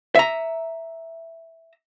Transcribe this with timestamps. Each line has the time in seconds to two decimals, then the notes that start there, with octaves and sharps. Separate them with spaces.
0.15 E5 A#5